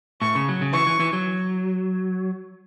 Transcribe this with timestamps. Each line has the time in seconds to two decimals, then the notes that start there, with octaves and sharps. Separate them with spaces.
0.22 A2 C#6
0.35 C#3
0.48 F#3
0.61 C#3
0.73 E3 C#6
0.87 E3
1.00 E3
1.13 F#3